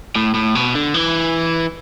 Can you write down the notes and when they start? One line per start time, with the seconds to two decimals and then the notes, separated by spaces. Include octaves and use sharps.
0.16 A2
0.34 A2
0.55 B2
0.75 D3
0.94 E3